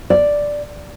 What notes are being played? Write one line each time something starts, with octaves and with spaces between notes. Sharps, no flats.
D5